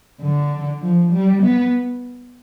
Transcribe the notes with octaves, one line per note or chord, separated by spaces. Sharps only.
D3
F3
G3
B3